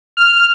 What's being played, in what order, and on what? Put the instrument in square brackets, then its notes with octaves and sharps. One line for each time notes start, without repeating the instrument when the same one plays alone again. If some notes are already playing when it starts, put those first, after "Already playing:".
[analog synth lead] F6